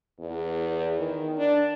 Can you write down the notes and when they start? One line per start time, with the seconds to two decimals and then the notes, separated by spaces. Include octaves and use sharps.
0.20 E2
0.99 D#3
1.38 D4